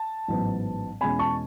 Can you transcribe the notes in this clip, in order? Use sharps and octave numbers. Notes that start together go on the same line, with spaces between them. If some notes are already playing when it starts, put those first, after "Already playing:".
Already playing: A5
A1 G#2 F#3 B3
E2 B2 G#3 C#4 G#5 B5
A5 C#6